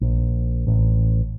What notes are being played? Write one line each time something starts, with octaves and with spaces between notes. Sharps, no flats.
A#1
A1